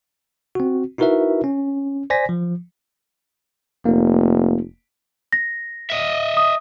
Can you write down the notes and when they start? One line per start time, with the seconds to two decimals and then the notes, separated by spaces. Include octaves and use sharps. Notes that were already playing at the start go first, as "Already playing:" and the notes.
0.55 C4 F#4
0.98 D#4 E4 F#4 A#4 B4 E5
1.44 C#4
2.10 C5 D5 G#5 A#6 B6
2.29 F3
3.85 F1 A#3
5.33 A#6
5.90 D#5 E5
6.37 D#6